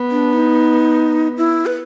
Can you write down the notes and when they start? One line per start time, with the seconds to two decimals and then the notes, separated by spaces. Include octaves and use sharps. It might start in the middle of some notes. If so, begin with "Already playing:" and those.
Already playing: B3
0.11 D4
0.33 D#4
1.38 E4
1.66 B4